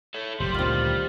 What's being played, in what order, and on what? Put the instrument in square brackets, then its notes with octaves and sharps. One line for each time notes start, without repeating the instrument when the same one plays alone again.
[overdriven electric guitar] A4 C#5
[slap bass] F#1 A2 [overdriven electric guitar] G3 [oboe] C5
[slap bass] D2 A#2 [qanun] D#3 C4 [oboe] F4